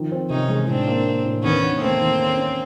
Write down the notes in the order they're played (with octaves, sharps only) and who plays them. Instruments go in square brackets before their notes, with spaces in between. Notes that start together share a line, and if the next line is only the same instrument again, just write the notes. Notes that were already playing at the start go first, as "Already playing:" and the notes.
Already playing: [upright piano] D#3 F3
C4
[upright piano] C3 [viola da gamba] C#4 D#4
[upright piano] G#3
[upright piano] A2 [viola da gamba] C4 D4
[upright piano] A#3
A#3
A2
[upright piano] D#2 [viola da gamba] B3 C#4
[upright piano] D#2
[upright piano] A3 [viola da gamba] A#3 C4
[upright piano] D#2
C#4
C#4